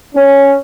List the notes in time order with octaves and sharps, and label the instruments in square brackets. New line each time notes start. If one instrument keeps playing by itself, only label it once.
[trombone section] C#4